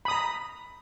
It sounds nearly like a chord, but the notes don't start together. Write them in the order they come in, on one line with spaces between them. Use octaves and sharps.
B5 D#6 A#5